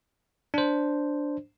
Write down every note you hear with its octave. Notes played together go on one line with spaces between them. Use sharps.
D4 C5